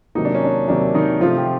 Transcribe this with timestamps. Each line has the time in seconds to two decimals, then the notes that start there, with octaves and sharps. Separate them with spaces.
0.15 C3 D#3 F#3 A#3 D#4
0.25 D4
0.35 C#4
0.44 D4
0.68 C3 D#3 F#3 A#3 D4
0.95 D#3 D#4
1.20 C3 F3 A3 F4
1.38 G4